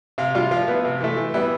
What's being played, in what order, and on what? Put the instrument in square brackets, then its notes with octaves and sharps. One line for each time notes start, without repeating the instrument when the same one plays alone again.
[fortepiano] C3 F5
G3 D4 F4
F3 F5
B3 E4
C3
E3 A3
E3
G3 B3 E4